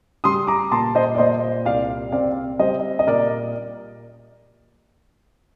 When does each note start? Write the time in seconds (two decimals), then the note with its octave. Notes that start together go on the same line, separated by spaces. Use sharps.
0.24 G3 C6 D#6
0.47 A#5 D6
0.72 A#2 A5 C6
0.95 C5 D#5
1.15 D5
1.18 A#2 C5 D#5
1.65 C2 D5 F5
2.12 C4 D5 F5
2.59 G3 C5 D#5
2.99 D#5
3.07 A#2 A#4 D5